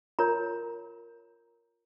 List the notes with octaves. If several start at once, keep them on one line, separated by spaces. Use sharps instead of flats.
F4 A#4 C#5 A#5